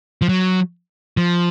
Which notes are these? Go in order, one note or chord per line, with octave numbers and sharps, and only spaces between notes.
F3
F#3
F3